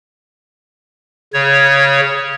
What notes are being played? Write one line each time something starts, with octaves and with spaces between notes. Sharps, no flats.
C#3 C#5